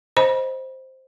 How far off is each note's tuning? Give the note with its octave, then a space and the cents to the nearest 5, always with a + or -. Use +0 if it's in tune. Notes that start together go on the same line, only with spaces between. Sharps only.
C5 +0 D#5 +5 B5 -35